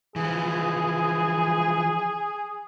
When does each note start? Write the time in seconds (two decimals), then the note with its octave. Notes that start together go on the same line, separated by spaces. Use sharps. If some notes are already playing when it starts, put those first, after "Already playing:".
0.16 E3 F3 G#4